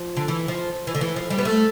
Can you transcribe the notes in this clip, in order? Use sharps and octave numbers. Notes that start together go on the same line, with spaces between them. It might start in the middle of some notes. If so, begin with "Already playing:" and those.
Already playing: F3
D3
E3
F3
E3
D3
E3
F3
G3
B3
A3